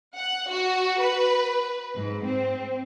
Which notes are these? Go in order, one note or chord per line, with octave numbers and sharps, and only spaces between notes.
F#5
F#4
B4
G#2
C4